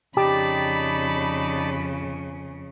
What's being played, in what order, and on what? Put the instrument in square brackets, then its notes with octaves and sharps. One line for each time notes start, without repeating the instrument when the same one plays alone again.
[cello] F2 C#3 [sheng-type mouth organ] D#4 D5 A5 [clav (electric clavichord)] G4 [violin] B5